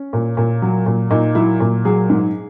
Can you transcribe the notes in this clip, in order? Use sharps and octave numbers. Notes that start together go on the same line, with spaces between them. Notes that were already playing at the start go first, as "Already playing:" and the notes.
Already playing: C#4
A#2
A#2
F#3
A#2
A#2 D#4
F#3 E4
A#2
F#3 G#4
G#2